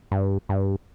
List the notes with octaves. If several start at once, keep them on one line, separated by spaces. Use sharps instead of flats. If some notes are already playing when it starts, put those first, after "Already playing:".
G2
G2